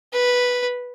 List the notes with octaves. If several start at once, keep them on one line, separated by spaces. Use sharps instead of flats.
B4